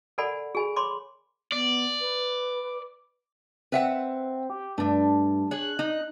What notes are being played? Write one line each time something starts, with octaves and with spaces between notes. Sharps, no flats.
A4 A#4 D5 F#5 G#5 B5
G#4 G#5 B5
C#5 B5 C6 D6
B3 D5
B4
C4 B4 E5 F#5
G4
G2 A3 D4
G#4 C#5 F#6
D#4